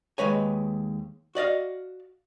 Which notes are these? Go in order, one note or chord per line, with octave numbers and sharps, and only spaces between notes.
D#2 G#3 B4 C#5 G#5
F#4 D5 D#5 F5